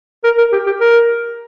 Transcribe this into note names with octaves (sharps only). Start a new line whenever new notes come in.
A#4
A#4
G4
G4
A#4